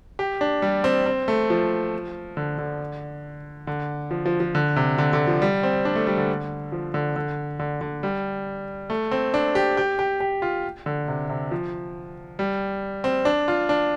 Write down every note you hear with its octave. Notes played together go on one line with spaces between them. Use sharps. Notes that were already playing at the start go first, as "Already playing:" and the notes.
G4
D4
G3
C4
C4
A3
F3
D3
D3
D3
F3
F3
F3
D3
C3
D3
D3
F3
G3
C4
D4
A3
G3
D3
F3
D3
D3
D3
D3
G3
A3
C4
D4
G4
G4
G4
G4
F4
D3
C3
C3
F3
G3
C4
D4
F4
D4